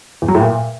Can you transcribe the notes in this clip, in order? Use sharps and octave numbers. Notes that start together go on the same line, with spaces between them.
E2
F#3
A2
A#2